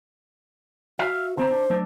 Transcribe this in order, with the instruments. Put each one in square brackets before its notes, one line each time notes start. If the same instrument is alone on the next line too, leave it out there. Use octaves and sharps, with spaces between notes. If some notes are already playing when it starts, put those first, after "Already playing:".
[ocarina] F#4 [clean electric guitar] E5 F5
[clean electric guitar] D3 C4 A#5 [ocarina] C5
[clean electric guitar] D4
F#3 A3 D4